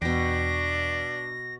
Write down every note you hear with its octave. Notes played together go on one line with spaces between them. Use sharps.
E2 B2 D4 G5 A#6